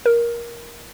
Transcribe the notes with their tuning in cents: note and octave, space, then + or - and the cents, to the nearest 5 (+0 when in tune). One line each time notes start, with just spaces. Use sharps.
A#4 +15